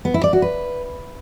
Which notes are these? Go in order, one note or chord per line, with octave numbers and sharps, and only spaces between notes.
B3
E4
D5
F#4
B4